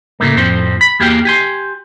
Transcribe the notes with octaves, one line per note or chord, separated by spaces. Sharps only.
A2 C#3 A3 A#3
F2 A2 F3 C4 C5
B5
E2 A#3 G4 G#4 F5 G5
G4 G#5 C6